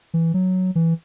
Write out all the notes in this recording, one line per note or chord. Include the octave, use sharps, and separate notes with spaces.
E3
F#3
E3